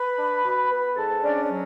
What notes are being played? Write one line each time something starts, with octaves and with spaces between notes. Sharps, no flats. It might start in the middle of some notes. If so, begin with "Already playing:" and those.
Already playing: B4 B5
D4
B2
B3
G#2 A4 A5
C#4 D4 D5
C#5
D5
F#3